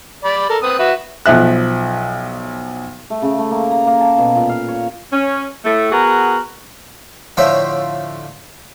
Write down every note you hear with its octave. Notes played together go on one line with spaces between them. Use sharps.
D5 B5
A4 A#4
C4 B4 D#6
F#4 B4 E5
B1 F3 E5 F#6
A3
C#3
A3
A#3
A#5
A#3
A5
B2
A#2
F5
C#5
C#4
A2 A3
B3 F#4 G#4 A#4
A2 D3 F3 C5 C#5 E5